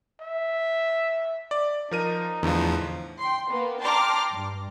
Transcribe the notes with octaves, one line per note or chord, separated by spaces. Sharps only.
E5
D5
F3 D#4 A#4 D#7
E2 A2 D3 F3
G5 C6
A#3 B3
G5 A5 A#5 C6 D6 F6
G2